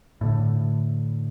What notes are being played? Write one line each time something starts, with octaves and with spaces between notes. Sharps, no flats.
A2 D3